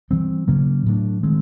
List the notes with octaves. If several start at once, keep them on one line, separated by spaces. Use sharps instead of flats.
E3 G3 C4
C#3 F#3 A#3 C#4
A2 F#3 A3 D4
D#3 G#3 C4